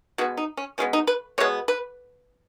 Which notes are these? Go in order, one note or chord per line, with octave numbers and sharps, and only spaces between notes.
B2 G#3 B3 F#4
D#4
C#4
B2 G#3 B3 C#4
D#4
B4
B2 G#3 B3 C#5
B4